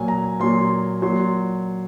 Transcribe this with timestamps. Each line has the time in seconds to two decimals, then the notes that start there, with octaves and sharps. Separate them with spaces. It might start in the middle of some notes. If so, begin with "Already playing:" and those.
Already playing: A#2 F#3 G#5
0.08 A#5
0.40 A#2 F#3 C6
1.02 A#2 F#3 C6